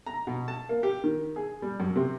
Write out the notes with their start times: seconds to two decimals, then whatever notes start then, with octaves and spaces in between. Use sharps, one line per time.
0.06 A#5
0.27 B2
0.48 A5
0.69 A#3
0.83 G4
1.04 D#3
1.36 G#4
1.62 G3
1.80 F#2
1.96 C3